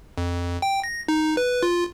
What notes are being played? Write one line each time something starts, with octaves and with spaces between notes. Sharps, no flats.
F2
G5
A#6
D#4
B4
F4